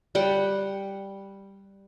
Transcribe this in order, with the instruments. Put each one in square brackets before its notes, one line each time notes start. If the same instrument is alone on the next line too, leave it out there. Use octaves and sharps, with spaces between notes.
[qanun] G3 F#5 G5